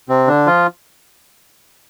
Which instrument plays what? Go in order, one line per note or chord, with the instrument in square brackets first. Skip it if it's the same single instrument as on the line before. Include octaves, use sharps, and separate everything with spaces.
[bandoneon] C3 C4
D3 D4
F3 F4